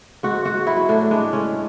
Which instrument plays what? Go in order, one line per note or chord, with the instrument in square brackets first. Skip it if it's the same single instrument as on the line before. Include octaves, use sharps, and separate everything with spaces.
[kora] G#2 F#4
G#2 F#4
F#3 E4
A2 D4
G#3 D4
G#3 C#4